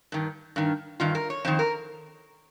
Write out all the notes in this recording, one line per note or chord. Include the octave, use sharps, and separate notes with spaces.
G2 D#3
G2 D#3
G2 D#3 F4
A#4
C#5
F2 D#3 C5
A#4